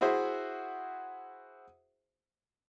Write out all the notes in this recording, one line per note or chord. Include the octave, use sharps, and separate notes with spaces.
E4 F#4 G#4 C5 E5